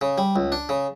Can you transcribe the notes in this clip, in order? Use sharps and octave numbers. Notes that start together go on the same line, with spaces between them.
C#3
G3
C#2
D4
C#3